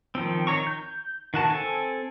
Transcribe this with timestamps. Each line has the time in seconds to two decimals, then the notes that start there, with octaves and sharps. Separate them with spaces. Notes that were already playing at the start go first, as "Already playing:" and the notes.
0.15 D#3 F3 C4
0.47 D#3 C#5 A#5 C#6
0.67 G6
1.34 D#3 F#4 A5
1.50 C4 A4 G#5